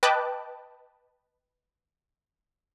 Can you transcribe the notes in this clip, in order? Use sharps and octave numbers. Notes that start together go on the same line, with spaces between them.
B4 D#5 G5 A5 D6 F#6